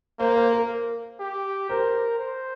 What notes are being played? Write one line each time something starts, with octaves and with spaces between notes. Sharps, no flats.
A#3 C5
C5
A#4
G4
A#4 C5
C5